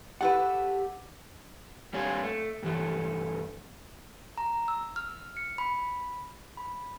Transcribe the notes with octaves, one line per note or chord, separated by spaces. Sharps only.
A3 E4 G4 B4 F#5
G3 C4 D4 C#5 F5 G#5
A3
G2 E3 A3
A#5
E6
F6
C#7
B5
B5